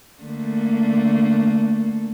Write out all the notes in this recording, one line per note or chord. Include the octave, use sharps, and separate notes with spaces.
D3 A3 A#3